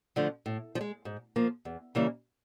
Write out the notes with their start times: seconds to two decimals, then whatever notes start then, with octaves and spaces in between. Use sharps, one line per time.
0.16 D3 F3 A3
0.46 A2
0.75 F3
0.81 G#3
1.05 G#2
1.36 F3 A#3
1.65 E2
1.95 C#3 E3 G3 A#3